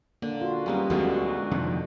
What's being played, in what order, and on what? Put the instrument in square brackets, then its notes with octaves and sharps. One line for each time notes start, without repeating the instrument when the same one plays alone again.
[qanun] D3 [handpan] A#3
[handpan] F4 F#4
[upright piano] F#2 G3 [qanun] G#3 A#3 B3
[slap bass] D2 F#3 G#3 [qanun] B2 D3 A3
[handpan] F#4
[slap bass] F2 C3 D#3